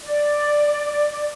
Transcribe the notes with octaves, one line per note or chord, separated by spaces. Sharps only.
D5